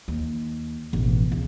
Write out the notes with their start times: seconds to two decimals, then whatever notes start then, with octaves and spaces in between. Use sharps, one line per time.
0.08 D#2
0.93 E1 A1
1.32 C#2